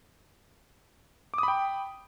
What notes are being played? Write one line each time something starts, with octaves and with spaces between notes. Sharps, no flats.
G5 B5 D6 D#6